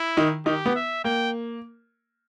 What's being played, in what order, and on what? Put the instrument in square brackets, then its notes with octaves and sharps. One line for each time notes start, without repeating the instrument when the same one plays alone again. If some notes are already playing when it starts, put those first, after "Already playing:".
Already playing: [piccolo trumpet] E4
[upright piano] D#3 D#4
[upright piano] D#3 D#4 [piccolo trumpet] G4
[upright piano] B3
[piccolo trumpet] E5
[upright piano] A#3 [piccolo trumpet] G5